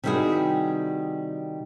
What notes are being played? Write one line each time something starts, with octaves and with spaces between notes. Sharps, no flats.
C3 D#3 G3 E4 F#4 G#4